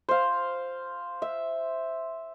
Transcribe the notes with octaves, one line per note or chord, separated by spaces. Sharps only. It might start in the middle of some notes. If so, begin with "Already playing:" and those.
C5 F5
E5